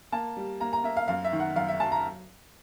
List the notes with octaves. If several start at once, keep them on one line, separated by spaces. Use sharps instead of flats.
A#3 A5
G3
A#3 A#5
A#5
A#3 E5
F5
F#2 F5
E5
D#3
F#5
F#2 F5
E5
F#3 A5
A#5